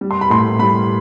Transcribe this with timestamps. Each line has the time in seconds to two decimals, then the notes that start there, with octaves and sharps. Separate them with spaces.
0.01 G3
0.11 C6
0.21 B5
0.30 A2 C6
0.59 G3 B5